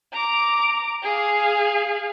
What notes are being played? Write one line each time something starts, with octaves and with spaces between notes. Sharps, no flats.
A#5 D6
G#4 F5